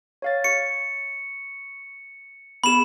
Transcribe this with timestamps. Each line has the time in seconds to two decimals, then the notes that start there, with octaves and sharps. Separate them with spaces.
0.22 C#5 F5 A6
0.44 C#6 C#7
2.64 B3 G#4 B5 E7